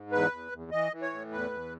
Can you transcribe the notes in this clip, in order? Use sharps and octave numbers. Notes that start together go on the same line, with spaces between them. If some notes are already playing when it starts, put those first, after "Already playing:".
Already playing: G#2
E2 B4
E2
E2
E3 D#5
E3
C#5
A2
E2 B4
E2